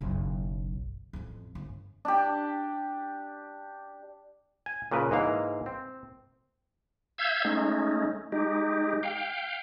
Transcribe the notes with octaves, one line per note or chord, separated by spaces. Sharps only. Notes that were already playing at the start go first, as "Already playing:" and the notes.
F#1 B1
A1 F2
G1
D4 G4
G#5
A#2 C#3 A#4 B4
G#2 E3 A#3 F5
C4
E5 F5 E6 G6 G#6
G#3 A3 C#4 D#4
G#3 D#4 G4
F5 G5